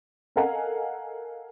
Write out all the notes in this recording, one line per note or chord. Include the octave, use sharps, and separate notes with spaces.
A4 A#4 D#5 F5 F#5 G#5